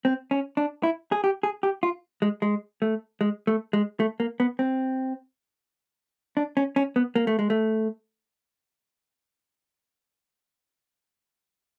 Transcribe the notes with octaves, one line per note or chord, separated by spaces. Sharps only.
C4
C#4
D4
E4
G#4
G4
G#4
G4
F4
G#3
G#3
A3
G#3
A3
G#3
A3
A#3
B3
C4
D4
C#4
C#4
B3
A#3
A3
G#3
A3